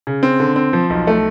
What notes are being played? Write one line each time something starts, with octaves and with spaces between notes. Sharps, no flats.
C#3
C4
D3
C4
F3
B1
A3